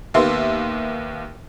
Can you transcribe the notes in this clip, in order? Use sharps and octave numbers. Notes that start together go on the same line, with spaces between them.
D#2 A#3 B3 E5 C6